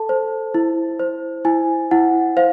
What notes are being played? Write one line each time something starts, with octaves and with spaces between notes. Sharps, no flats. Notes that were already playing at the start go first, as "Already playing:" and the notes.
Already playing: A4 A5
C5
E4
C5
E4 G#5
E4 F#5
C5 F5